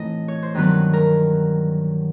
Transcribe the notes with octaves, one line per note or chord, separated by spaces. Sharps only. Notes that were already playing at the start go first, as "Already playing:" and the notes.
Already playing: A2 E3 A3 C4 D#4 D#5
C#5
C5
G2 D#3 F#3 B3 B4
A#4